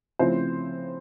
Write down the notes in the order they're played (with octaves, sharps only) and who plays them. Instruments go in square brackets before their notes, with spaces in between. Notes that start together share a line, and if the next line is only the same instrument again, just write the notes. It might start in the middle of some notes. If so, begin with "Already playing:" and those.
[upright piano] C#3 F3 A3 C4 E4 C5